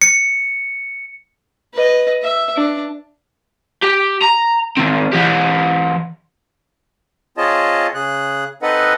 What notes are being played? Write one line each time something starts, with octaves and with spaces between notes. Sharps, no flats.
C#7
B4 D#5
E5
D4
G4
A#5
D#3 C4
E3 G4
C4 F4 G#4 C#5 D#5 A5
C#3 G#4 F#6
C4 D#4 A4 B4 D#5 F#5